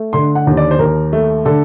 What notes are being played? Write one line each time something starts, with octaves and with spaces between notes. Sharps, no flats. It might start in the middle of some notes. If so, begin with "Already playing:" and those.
Already playing: A3
D3 C6
F#5
D#2
D5
C5
D#2 A#4
A3
D3 A4